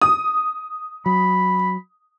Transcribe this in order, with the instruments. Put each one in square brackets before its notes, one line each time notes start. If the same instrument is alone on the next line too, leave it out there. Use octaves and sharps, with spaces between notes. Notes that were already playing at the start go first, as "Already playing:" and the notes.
[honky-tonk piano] D#6
[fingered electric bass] F#3 [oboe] B5